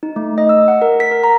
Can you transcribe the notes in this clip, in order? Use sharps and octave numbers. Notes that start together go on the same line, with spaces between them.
D#4
A3
D#5
E6
F#5
A#4
B6
A#4
A#5